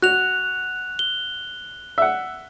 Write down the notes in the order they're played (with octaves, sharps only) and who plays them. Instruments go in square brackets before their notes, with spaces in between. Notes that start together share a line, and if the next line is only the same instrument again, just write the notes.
[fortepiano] F#4 [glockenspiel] F#6 F7
[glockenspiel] G7
[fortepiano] E5 F#5